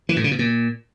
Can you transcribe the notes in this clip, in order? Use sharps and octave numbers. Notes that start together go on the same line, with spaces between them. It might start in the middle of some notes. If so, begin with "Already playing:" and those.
E3
A2
C#3
B2
A#2